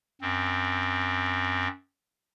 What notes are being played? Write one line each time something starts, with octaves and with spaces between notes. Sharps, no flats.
F#2 C4